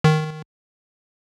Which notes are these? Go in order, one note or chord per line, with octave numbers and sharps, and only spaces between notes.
D#3